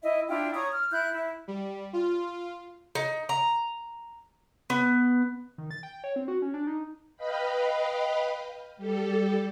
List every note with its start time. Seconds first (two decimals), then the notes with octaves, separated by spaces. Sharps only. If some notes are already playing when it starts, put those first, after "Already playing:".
0.02 E4 D#5 E5
0.28 D4 E4 F4 G5
0.54 C#5 A#5 C#6 D#6
0.73 F6
0.91 E4 F#6 G6
1.11 E4
1.48 G3
1.93 F4
2.95 D#4
3.29 A#5
4.70 B3
5.58 D#3
5.71 A6
5.83 G5
6.04 C#5
6.16 C4
6.28 F#4
6.42 C#4
6.54 D4
6.67 D#4
7.17 B4 D#5 F5 G5 B5
8.77 G3 G4 A4